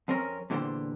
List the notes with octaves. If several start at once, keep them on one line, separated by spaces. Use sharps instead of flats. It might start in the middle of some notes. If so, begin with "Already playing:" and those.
F2 C4 C#4 A#4
E2 A#2 D3 C#4 G4 C5